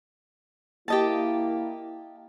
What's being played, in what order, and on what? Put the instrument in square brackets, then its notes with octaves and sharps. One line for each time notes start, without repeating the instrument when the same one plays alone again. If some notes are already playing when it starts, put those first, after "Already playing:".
[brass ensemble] A#3 E4 [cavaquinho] G4 D#5 A5